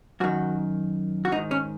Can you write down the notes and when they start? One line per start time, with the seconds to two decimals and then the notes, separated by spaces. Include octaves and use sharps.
0.20 F#2 D#3 F#4
1.25 F#4
1.32 G#2 D#4
1.36 D#3
1.51 C#4